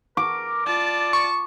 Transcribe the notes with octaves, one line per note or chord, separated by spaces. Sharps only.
A#4 D6
F4 D5 A5
C#6